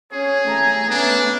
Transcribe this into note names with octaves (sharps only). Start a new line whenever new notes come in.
C#4 G#4
A3 G#5 A#5
A3 B3 C#4 D4